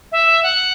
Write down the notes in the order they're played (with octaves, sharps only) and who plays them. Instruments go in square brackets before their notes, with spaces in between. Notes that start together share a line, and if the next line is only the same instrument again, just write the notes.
[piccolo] E5
F#5